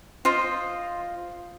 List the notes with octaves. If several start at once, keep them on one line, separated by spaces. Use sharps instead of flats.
F4 C5 D#5